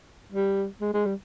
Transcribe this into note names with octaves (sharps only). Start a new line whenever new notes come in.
G3
G#3
G#3
G3